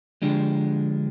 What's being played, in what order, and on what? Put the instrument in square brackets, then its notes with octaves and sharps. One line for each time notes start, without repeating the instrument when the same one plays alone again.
[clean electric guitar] D3 F3 G#3 D4 G4